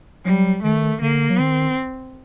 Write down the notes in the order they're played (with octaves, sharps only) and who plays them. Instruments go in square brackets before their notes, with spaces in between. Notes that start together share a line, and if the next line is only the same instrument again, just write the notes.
[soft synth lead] F#3 [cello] G3
[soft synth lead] D#3 [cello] A3
[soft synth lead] D3 [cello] A#3
[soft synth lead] F#3
[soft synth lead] D#3 [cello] C4